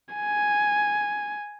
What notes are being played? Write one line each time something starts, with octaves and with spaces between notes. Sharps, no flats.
G#5